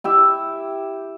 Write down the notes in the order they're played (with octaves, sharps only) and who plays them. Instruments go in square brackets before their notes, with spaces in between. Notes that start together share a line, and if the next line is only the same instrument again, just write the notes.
[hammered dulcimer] E4 G4 E5